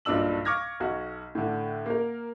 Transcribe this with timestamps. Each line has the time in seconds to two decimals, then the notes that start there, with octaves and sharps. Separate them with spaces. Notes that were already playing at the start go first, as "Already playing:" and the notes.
0.05 B1 G2 A#2 D4 E6 F#7
0.45 F5 C#6 D6 F6 G#6 A#6
0.80 B1 F#4
1.35 A2 D3
1.86 A#3 A#4